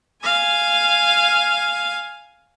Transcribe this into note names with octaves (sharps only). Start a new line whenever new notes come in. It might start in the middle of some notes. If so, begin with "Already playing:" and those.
F5 G#5